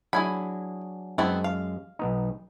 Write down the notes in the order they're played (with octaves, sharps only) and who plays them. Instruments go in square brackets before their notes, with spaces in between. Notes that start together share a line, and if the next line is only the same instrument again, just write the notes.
[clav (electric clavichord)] F#3 D4 G#4 [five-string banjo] E4 G#5 B5
[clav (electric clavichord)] F#2 G#3 A5 [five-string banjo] B3 C4 E4
[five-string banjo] F5
[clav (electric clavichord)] B1 B3 D#4